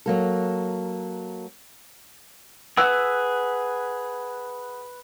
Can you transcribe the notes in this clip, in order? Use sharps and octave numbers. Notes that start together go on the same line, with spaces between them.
F#3 A#3 A4
G#4 B4 F#5 E6